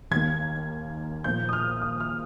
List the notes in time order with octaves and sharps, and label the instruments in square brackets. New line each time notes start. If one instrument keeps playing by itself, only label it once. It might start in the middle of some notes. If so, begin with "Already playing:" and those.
[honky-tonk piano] D#2 D#3 A#3 G#6
A#2 F3 A#3 G6
D#6
F6
D#6
F6